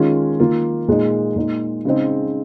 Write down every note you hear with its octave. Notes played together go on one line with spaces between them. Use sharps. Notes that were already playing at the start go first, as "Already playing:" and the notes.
Already playing: D#3 G#3 C#4 F4
D#3 A#3 F4
A#2 G#3 D#4
A#2 G#3 D#4
C#3 G#3 C4 D#4